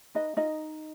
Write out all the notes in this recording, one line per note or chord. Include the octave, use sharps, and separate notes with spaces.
D#4 B4 D#5
D#4 F4 D#5